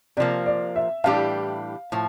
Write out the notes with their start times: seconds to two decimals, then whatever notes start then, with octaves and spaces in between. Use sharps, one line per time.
0.17 C3 F3 A#3 D5
0.46 D5
0.76 E5
1.04 A2 E3 G3 D4 G4 F5
1.92 A2 F3